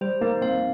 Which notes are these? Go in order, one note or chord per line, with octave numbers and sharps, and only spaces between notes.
G3 C5
A#3 D#4
C4 F5